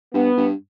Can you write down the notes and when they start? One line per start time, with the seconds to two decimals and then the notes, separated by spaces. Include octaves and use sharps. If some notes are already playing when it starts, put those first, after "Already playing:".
0.13 G2 B3
0.37 G2